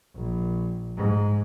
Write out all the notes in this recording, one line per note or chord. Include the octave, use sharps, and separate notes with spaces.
A#1
G#2